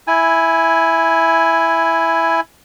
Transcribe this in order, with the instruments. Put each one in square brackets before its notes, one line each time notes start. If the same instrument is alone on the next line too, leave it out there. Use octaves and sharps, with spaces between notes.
[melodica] E4 G#5